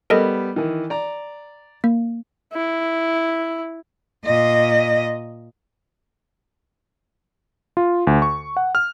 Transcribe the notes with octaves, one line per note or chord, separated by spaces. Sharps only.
G3 B3 A4 A#4 D#5
D#3 E3
D5 A#5
A#3
E4
A#2 D#5
F4
D2
C#6
F#5
F6